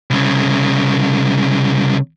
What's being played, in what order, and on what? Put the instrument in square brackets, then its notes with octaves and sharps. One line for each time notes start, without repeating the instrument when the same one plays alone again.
[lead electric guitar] C2 C#3